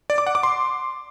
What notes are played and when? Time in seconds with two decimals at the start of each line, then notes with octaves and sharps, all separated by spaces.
0.10 D5
0.18 D6
0.27 F#5
0.35 D6
0.43 C6